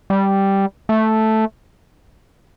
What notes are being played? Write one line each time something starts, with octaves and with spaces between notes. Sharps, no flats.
G3
A3